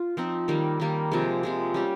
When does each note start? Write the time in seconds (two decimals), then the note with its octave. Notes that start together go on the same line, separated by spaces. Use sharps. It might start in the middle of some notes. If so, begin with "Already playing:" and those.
Already playing: F4
0.17 F3 C4 D#4
0.48 D#3 G3 A#3
0.80 D#3 G3 A#3
1.12 C3 F3 G#3
1.43 C3 F3 G#3
1.74 G3 C#4 G4